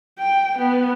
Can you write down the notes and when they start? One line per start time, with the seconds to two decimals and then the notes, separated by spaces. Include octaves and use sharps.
0.19 G5
0.58 B3